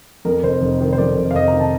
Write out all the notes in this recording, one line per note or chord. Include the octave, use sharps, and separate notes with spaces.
F2 A#4
F1 C5
F1
D#3
C5
F2 D5
F1
F5
F1 D#5
A#5
D#3
A5